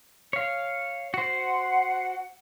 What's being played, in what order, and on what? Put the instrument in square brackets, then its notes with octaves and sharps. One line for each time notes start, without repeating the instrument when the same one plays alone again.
[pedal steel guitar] C#5 F5
F#4 C5
[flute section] F#5